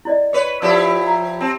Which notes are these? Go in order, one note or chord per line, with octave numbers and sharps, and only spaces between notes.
E4 D5 D#5
B4 C#5
F3 E4 G4 D5
A#5
C4 A5